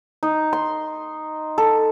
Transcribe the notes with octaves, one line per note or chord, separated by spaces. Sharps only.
D#4
C6
A4